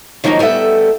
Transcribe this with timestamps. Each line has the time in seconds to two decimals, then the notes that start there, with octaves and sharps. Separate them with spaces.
0.24 D#3 F3 F#3 A#3 D4 D#4
0.39 G3 B3 A4 D#5 E5